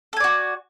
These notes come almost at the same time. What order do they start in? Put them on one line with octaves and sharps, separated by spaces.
A4 G#5 D5 F#4